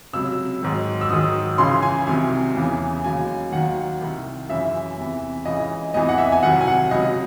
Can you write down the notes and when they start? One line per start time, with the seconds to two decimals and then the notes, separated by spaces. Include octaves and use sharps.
0.13 C#2 C3 F#3 E6
0.61 G#2 D#3 F#3
1.01 E6
1.10 G#2 D#3 F#3 D#6
1.58 C#2 C#3 E3 C6
1.83 G#5
2.07 C2 C3 D#3 F#3 G#5
2.56 E2 C#3 E3
3.04 D#2 C#3 F#3 G#5
3.52 D#2 D#3 F#3 F#5
4.01 C2 C3 D#3
4.49 F#2 C#3 E3 E5
4.97 E2 C3 E3
5.45 C#2 C#3 E3 D#5
5.94 E2 C3 E3 D#5
6.09 F#5
6.18 E5
6.32 G#5
6.43 C2 C3 D#3 F#3 F#5
6.61 G#5
6.67 F#5
6.91 C#2 C3 F#3 D#5